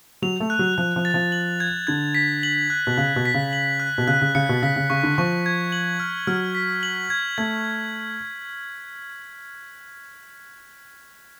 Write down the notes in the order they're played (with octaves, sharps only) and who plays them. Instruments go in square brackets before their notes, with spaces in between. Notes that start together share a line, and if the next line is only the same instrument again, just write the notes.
[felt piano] F#3 [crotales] F7
[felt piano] A3
[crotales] F#6
[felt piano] F#3
[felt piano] F3 [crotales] F#6
[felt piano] F3
[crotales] A6
[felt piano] F3
[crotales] F#7
G#6
[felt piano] D3 [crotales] G#6
[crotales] B6
F#7
F#6
[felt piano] B2
[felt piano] C#3 [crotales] F#6
[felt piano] B2
[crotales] B6
[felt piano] C#3
[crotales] F#7
F#6
[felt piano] B2
[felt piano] C#3 [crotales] F#6
[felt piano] C#3
[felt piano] C#3 [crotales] C#7
[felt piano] B2
[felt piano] C#3 [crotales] B6
[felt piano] C#3
[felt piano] C#3 [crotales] C#6
[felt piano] D3
[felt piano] F3 [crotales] C#6
[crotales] G#6
F#7
F6
[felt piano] F#3 [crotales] F6
[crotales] B6
F#7
G#6
[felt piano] A3 [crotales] G#6